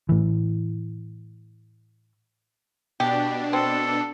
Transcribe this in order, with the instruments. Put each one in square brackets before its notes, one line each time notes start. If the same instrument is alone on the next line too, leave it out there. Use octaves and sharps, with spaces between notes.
[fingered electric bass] A2 E3
[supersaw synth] B2 D4 [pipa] G4
[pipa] C4 [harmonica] A4